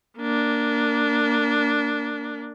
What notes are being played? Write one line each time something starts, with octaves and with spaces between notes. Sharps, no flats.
A#3 D4